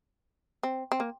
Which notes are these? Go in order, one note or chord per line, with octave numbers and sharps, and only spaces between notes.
C4
C4
A#3